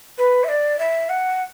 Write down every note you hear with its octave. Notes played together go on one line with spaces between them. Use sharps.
B4
E5
D5
E5
F#5